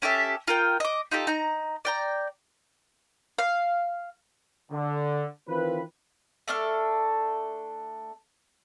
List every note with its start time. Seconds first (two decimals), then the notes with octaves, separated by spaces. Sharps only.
0.02 C#4 G4 A4 E5
0.47 F4 A#4 G5
0.80 D#5 D6
1.12 D#4 F4 G4 A4
1.27 D#4 A#5
1.85 D5 G5 A#5
3.38 F5
4.71 D3
5.48 D#3 E3 C4 F4 B4
6.48 A3 D4 A4 F6